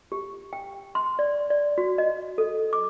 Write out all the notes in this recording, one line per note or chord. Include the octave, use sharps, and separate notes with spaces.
G4
G5
C6
D5
D5
F#4
D#5
A4
D6